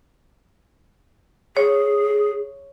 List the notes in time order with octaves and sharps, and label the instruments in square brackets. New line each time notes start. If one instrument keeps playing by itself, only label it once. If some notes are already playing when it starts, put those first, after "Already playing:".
[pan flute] G#4 [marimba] C#5